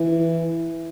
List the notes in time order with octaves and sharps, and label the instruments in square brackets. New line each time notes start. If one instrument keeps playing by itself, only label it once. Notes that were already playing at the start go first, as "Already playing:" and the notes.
Already playing: [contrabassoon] E3